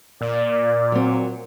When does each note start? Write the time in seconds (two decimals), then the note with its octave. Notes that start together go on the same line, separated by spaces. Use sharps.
0.21 A#2 D5
0.92 F#3 C4